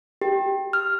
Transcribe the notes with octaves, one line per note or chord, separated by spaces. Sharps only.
G4
F6